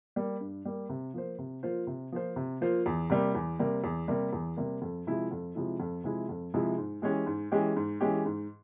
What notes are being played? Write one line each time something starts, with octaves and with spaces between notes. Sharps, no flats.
G3 A#3
G2
G3 A#3
C3
F3 A#3 F4 C5
C3
F3 A#3 F4 C5
C3
F3 A#3 F4 C5
C3
F3 A#3 F4 C5
E2
C3 G3 A#3
E2
C3 G3 A#3
E2
C3 G3 A#3
E2
C3 G3 A#3
F2
C3 F3 G#3 E4
F2
C3 F3 G#3 E4
F2
C3 F3 G#3 E4
F2
C3 F3 G#3 E4
G#2
E3 G#3 C#4 G4
G#2
E3 G#3 C#4 G4
G#2
E3 G#3 C#4 G4
G#2